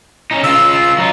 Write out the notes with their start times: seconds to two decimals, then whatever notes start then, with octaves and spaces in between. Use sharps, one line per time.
0.31 C#4 D#4
0.43 C#3 F4 E6
0.98 F#3 D#4